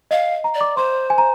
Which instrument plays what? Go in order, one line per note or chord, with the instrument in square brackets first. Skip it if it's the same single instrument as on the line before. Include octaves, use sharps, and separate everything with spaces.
[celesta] D#5 [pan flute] F5
[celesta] A#5
[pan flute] D5
[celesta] D6
[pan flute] C5 [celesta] C6
[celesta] G#5
A#5